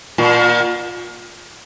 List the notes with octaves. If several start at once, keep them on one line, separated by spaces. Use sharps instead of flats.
A#2